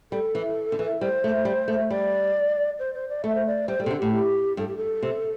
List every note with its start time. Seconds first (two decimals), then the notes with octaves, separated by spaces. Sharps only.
0.12 G3 A4
0.35 E3
0.72 D3
0.79 E3
1.01 G3 C5
1.24 A3
1.45 G3
1.68 A3
1.90 G3 D5
2.79 C5
2.95 C5
3.09 D5
3.24 A3 E5
3.35 C5
3.46 D5
3.68 G3 C5
3.80 G3
3.83 C3 A4
3.91 D3
3.98 A2 G4
4.13 G4
4.57 G2 A4
4.67 G4
4.77 A4
5.02 C3